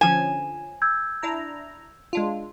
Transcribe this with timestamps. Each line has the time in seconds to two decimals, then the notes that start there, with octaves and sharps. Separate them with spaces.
0.01 D3 F3 C#4 G#5 E7
0.82 E6 G6 G#6
1.23 D4 E4 A#5
2.13 G#3 D4 F4